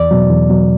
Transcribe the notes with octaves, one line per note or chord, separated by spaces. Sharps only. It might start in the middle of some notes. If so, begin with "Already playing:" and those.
Already playing: E2 D5
B2 F#3
E2
B2 F#3